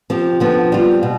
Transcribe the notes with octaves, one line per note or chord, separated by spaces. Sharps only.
F3 C4 G4
D3 F3 B3
G3 C4 F4
B2